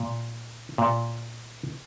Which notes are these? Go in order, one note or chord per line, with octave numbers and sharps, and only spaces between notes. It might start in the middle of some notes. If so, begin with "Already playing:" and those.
Already playing: A#2
A#2